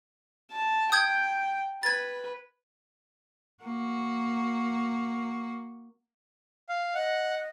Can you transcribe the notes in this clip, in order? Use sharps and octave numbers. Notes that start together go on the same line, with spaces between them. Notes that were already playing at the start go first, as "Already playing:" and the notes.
A5
G5 D#6 G6 G#6
B4 G#6 A6
A#3 F#4
F5
D#5 F#5